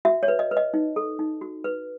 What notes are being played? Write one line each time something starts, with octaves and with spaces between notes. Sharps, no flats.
F#4 E5
C#5
B4
D#5
B4
D#5
D#4
A4
D#4
F#4
B4